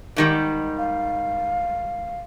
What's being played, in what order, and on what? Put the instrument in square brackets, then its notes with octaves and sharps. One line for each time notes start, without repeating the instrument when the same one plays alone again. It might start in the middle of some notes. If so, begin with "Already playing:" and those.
[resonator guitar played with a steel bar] G#2 D#3 G3
[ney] F5